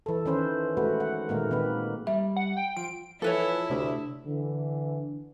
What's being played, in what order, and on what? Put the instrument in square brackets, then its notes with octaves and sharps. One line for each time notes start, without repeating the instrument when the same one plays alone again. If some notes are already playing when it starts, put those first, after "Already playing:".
[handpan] E3 A4
D#3 E3 C#4 B4 C5
G#3 A3 F#4 B4
F#5
A#2 D#3 G#3 A#3 A#4
D#3 A#3 C4 B4
[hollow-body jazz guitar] G3 [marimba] E5
[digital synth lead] F#5
G5
[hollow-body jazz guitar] F3 [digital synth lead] D7
[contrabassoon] E3 [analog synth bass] F3 [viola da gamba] E4 [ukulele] A4 B4 C#5
[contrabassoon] D2 [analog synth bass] C3
[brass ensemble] D3 E3